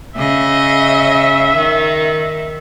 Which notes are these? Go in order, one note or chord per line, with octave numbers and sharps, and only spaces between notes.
C#3 D#5 E5
D#3